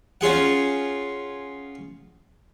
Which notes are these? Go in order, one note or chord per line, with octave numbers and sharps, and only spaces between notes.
C#4 F4 G#4 F#5